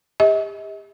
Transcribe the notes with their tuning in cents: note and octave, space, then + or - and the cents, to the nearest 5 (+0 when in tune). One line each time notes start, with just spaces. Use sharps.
G4 +40 D#5 +45